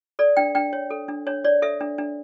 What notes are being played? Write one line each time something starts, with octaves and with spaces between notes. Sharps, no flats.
A4 D5
D4 G5
D4 G5
C#5
A4
D4
D4 C#5
C#5 D5
A4 E5
D4
D4